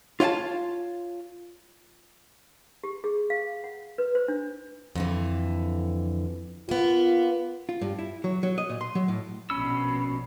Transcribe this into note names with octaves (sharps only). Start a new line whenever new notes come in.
F4 C#5 F5 G5 A5
G4
G#4
F5
F#5
B4
C5
D4
F2 D3 E3
A#3 B3 F4
F4
G2
E4
F#3
F#3
D#5
A#2
C6
F#3
A2
A#1 B2 C#4 B5 E6